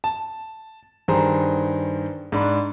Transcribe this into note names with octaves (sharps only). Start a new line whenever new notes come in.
A5
G2 D#3 G#4 C5 A#5
G#2 D4 B5